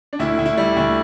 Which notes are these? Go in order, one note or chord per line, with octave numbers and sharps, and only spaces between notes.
D4
D2 E4
D2
E4
G3
D2